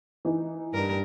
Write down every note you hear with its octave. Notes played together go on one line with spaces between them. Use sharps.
E3 D#4
G2 A#4